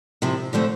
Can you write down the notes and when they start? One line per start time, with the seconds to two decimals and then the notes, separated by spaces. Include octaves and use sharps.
0.22 C3 F3 C4 E4
0.53 D3 F3 A3 C4